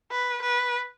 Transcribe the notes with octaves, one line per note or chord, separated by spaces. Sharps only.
B4
B4